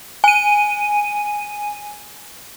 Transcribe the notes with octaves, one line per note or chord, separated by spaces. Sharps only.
G#5 D#7